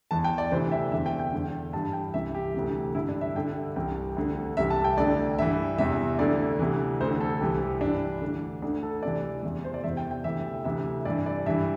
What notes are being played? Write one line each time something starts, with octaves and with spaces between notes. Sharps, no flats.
E2 E3 A5
G5
D5
D2 C3 E3 C5
E5
E2 D3 E5
G5
G5
E2 D3
G2 E3 A5
G5
C2 C3 E3 E5
G4
D2 C3 E3
G2 D3 E4
D4
E5
G2 D3 G5
C2 C3 E3 G5
D2 D3
C2 C3 E3 E5
A5
G5
D2 D3 D5
G2 E3 E5
E2 C3 E3 E5
D2 D3 D5
D2 C3 E3
D2 D3 C5
A4
C2 C3 E3 G4
G4
G2 E3 D4
D2 D3
D2 D4
D3
A4
D2 C3 E3 D5
E2 C3 E3
C5
D5
E2 C3 E3 E5
G5
G5
D2 C3 E3 E5
D2 C3 E3 E5
G2 E3 D5
D5
G2 E3 E5